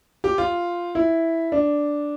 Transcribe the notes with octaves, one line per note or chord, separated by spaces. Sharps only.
G4
F4
E4
D4